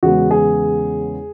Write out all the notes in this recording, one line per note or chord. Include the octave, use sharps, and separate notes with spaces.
E2 C#3 G#3 B3 F#4
G#4